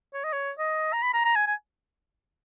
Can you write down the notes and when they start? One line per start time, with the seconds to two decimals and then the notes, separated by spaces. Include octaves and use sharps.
0.14 C#5
0.24 D#5
0.33 C#5
0.59 D#5
0.93 A#5
1.02 B5
1.14 A#5
1.25 A#5
1.35 G#5
1.47 G#5